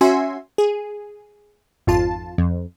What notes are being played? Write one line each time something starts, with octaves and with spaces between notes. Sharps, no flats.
C#4 F#4 E5 G#5 C6
G#4
G#1 F2 F4 A5
F2